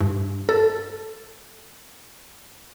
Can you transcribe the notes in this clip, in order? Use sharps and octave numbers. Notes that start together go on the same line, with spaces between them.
G2
A4